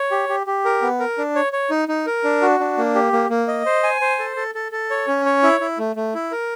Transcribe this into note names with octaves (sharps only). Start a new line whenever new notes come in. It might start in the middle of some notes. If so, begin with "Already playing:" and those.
Already playing: C#5
G4
G4
G4
A#4
B3
A#4
D4
C#5
C#5
D#4
D#4
A#4
D4
F#4
D4
A#3
G4
A#3
A#3
D#5
C5
G#5
C5
A4
A4
A4
A4
C#5
C#4
C#5
E4
E4
A3
A3
E4
A#4